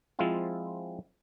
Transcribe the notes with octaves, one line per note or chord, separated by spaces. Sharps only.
F3 G#3 C4 E4 F4